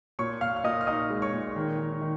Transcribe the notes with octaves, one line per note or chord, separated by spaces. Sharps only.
A#2 C#5 C#6
A#2 F5 F6
F6
A#2 D#5 D#6
F6
D#4 D#5 D#6
G#3
C#5 C#6
A#2
D#3
D#3
D#3